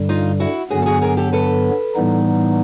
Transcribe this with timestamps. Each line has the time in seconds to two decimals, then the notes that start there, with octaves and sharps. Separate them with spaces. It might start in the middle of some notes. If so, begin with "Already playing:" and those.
Already playing: G2 D3 G3
0.09 D#4 F4
0.40 E4 F#4
0.70 G2 D3 F#3 B3 F#4 G#4
0.82 A4
0.86 F#4 G#4
1.01 G#4 A#4
1.17 G4 A4
1.33 A4 B4
1.95 A2 E3 G3 B3 D#4